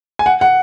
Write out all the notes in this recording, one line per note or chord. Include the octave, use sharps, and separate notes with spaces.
G#5
F#5
F#5